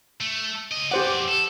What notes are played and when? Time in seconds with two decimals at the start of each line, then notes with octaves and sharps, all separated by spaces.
0.21 A3
0.72 C#3 D#5
0.91 F2 G4 C5 D5 F#5
1.28 A4